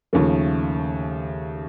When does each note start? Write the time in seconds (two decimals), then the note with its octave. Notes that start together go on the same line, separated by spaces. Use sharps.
0.13 D#2 C#3 F3 A3